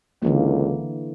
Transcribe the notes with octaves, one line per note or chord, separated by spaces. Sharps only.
C#2 D3 E3 A#3